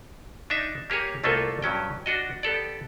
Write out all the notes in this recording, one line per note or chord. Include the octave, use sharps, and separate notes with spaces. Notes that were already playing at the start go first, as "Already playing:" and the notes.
D4 D#4 E5
A#3 G4 G#4 C#5
C2 A3 A#3 F4 A4 G#5
G2 F#3 C#4 G5
D4 F#4 D#5
B3 G4 A4 D5